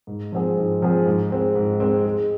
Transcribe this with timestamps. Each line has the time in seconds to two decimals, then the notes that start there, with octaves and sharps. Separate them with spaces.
0.07 G#2
0.32 F3 C4 G#4
0.57 G#2
0.82 F3 C4 G#4
1.06 G#2
1.30 G#3 C4
1.55 G#2
1.80 G#3 C4
2.05 G#3